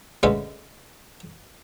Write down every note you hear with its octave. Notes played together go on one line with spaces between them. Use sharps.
D3 G#3 A3 C#4 E4 B4